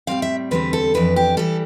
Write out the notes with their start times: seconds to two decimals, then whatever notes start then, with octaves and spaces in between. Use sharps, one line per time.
0.07 A2 G3 C4 F5
0.22 E5
0.51 E2 D3 G3 C4 B4
0.73 A4
0.94 F2 E3 B3 D4 B4
1.16 G4
1.37 E3 G3 A4